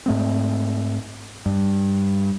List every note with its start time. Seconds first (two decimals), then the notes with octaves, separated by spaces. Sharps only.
0.06 G#2 A3 C4
1.46 G2